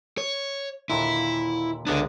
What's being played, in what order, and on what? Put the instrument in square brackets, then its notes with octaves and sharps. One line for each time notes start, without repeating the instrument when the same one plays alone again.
[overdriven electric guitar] C#5
[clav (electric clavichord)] D#2 A#2 D3 [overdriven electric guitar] E4
[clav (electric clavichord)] C#2 A#3 B3 [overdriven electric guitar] D3 D4